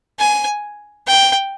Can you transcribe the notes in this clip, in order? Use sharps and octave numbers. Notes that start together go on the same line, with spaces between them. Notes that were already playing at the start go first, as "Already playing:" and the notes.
G#5
G5